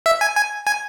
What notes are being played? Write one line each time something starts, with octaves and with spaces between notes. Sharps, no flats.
E5
G#5
G#5
G#5